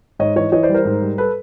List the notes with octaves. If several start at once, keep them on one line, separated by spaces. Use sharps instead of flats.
G#2 C#5 D#5
E3 C#5 D#5
E3 C#5 D#5
C5 D5
G3
A#4 C5
G#2
G3
A4 B4